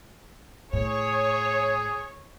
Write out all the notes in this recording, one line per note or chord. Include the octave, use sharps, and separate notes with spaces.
A2 G#4 C#5